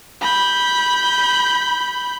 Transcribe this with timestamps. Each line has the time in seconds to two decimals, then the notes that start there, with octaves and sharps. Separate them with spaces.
0.21 B5 G6